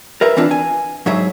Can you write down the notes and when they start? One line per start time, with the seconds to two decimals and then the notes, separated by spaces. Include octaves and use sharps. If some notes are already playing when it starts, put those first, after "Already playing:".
0.21 A#4 B4 E5
0.36 E3 C4 D4 F4 B4
0.51 G#5
1.06 G#2 F#3 G#4 E5